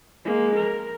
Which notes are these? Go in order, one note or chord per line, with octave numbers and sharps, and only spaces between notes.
G#3 A#3
A#4